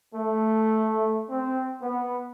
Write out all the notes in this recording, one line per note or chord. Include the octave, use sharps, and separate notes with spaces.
A3
C4
B3